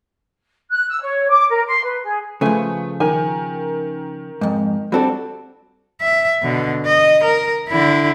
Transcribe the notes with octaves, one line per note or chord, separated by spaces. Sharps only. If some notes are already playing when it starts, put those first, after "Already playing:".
F#6
E6
C#5
D6
A#4
C6
B4
G#4
C#3 F3 A3 G#4 B4 G#5
D#3 G#5
F2 G#2
G3 C4 D4 F#4 A4
E5
B2 D3
D#5
A#4
D3 E4